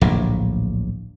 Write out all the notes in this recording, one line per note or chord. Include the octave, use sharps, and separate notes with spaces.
D1 A#1 A2